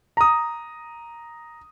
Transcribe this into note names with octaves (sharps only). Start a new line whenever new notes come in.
A#5 D#6